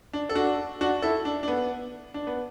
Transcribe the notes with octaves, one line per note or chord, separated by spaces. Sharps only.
D4
A4
D4 F#4
D4 F#4
E4 A4
D4
D4
B3
D4
B3